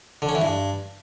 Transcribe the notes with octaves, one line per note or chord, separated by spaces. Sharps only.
D3
C#4
E3
G2